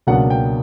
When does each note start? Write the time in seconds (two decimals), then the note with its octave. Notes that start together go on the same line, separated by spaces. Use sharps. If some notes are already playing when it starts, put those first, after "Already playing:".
0.07 C#2 B2 F#3 A#3 D4 F#5
0.30 G5